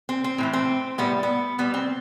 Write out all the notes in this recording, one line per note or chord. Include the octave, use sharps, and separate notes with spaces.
C4
C4
A2 E3 A3
C4
A2 G3 B3
B3
B2 G3 B3
C4